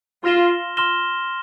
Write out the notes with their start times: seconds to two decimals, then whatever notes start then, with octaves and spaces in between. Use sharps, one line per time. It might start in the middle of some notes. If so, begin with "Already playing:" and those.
0.24 F4 C6 F6 A#6 E7 G7
0.77 C6 F6 A#6 E7 G7